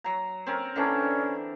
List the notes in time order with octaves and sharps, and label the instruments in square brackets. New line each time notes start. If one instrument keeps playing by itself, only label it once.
[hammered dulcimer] F#3 A#5
C4 C#4 A#4
[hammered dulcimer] D3 E3 D4 [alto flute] C#4